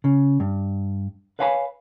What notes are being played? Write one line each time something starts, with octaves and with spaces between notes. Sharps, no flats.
C#3
G2
B4 C#5 F5 G#5 A5 B5